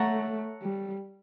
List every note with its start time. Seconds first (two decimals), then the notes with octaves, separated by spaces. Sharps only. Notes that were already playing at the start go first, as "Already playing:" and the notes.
Already playing: A3 A4 C#5 F#5 A#5
0.62 G3